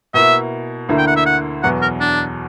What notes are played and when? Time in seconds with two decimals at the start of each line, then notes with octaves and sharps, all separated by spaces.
0.14 B2 A#3 E4 E5
0.89 D2 D3 A#3 E4
0.98 G5
1.07 F#5
1.16 E5
1.26 F#5
1.63 E2 B2 F#3 F#5
1.82 A#4
2.00 D4